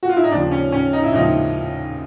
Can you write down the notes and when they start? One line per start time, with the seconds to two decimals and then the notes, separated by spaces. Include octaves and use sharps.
0.03 F#4
0.09 F4
0.17 E4
0.24 D#4
0.31 D#2 C#3 F3 D4
0.51 C#4
0.72 C#4
0.93 D#4
1.04 E4
1.13 D#2 C#3 F3 D#4